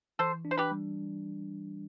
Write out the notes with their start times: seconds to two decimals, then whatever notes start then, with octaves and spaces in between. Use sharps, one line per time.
0.19 E3 A4 C5
0.45 D4
0.51 C5
0.58 G4 B4
0.71 G3